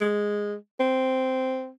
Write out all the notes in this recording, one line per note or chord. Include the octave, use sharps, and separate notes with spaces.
G#3
C4